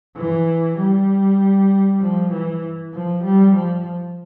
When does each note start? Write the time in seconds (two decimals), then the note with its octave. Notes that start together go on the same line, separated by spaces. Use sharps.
0.17 E3
0.77 G3
2.01 F3
2.32 E3
2.94 F3
3.24 G3
3.55 F3